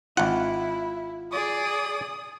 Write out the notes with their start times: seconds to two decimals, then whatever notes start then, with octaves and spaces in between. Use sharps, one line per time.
0.17 G#1 E4 F4 F#5
1.32 G#4 D5 D#6